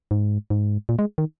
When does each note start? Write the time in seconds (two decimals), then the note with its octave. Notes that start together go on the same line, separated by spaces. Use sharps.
0.11 G#2
0.50 G#2
0.89 A#2
0.99 G#3
1.18 D#3